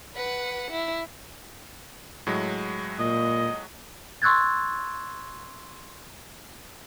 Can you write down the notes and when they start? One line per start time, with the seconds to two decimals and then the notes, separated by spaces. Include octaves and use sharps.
0.15 B4 F#5
0.71 E4
2.27 A2 F#3 G#3
2.99 A#2 D#5
4.22 C6 C#6 E6 F#6 G#6 A6